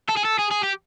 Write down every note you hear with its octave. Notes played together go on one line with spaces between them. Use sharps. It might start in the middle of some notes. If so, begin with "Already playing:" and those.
A4
G#4
A4
G#4
G#4
G4